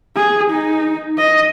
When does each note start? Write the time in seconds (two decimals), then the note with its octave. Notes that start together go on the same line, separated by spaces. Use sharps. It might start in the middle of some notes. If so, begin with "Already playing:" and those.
0.16 G#4
0.51 D#4
1.18 D#5